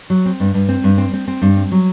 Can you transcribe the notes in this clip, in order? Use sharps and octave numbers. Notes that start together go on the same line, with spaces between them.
F#3
C4
G2
G2
C4
G2
C4
C4
C4
G2
C4
F#3